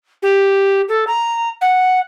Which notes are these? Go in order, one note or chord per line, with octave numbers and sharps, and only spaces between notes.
G4
A4
A#5
F#5